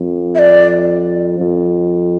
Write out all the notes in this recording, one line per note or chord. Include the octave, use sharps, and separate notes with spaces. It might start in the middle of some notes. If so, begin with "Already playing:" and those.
Already playing: F2
E5
D5
F2